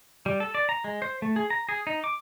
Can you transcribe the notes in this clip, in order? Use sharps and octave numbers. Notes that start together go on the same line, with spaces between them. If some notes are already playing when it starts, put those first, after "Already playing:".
G3
A4
D5
A#5
G#3
C5
A3
G#4
A#5
G#4
D#4
D6